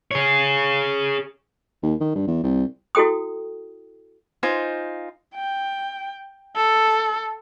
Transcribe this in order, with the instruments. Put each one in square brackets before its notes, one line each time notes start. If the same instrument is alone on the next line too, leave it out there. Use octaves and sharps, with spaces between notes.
[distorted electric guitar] G#4 C#5
[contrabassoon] D#2
D#3
G2
E2
C2
[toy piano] E4 F#4 A4 G5 D#6
[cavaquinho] D#4 F4 C5 G#5
[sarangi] G5
A4